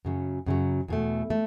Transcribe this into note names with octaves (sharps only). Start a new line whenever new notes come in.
F#2 C#3 F#3
F#2 C#3 F#3
E2 B2 A3
A3